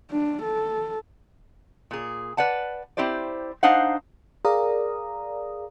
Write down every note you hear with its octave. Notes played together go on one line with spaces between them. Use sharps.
D4
A4
A#2 G#4
B4 D5 F#5 A5
C4 E4 G4 C5 D5
D4 D#4 C5 F5 F#5
G#4 A#4 D5 F5 A#5 D#6